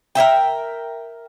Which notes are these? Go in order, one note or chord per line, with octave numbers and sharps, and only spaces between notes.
A#4 C#5 E5 G5